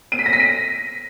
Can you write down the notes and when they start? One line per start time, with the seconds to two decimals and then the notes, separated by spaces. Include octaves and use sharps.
0.12 D#7
0.19 B6
0.26 A#6
0.33 B6
0.40 D#7